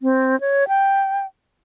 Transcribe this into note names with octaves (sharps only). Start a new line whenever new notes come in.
C4
C#5
G5